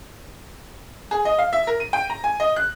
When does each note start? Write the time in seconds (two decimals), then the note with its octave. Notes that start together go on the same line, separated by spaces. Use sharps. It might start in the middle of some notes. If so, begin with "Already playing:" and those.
1.11 G#4
1.25 D#5
1.38 F5
1.53 E5
1.67 A#4
1.80 D#7
1.93 G5
2.10 A#5
2.24 G#5
2.40 D#5
2.56 F#6